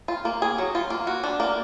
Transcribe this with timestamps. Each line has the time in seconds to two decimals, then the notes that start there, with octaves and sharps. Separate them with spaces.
0.08 F4
0.25 A#3
0.42 G#4
0.58 F#3
0.75 F4
0.90 A#3
1.07 F#4
1.24 D4
1.40 A#3